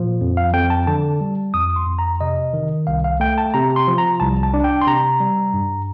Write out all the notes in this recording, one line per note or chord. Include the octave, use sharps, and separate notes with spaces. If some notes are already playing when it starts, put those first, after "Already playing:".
Already playing: A#2 F3
F2
F5
F2 G5
A5
D3 A5
G3
F2 D#6
C6
F2
A#5
C3 D#5
D#3
C2 F5
F5
A3 G5
A5
C3 A#5
C6
F3
A#5
C2 A5
A5
D4
G5
C6
C3 A#5
G3
G2